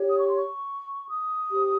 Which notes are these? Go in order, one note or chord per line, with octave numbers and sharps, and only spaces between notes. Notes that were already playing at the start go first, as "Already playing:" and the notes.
Already playing: G4 C#5
D#6
C#6
C6
C#6
D#6
G4 C5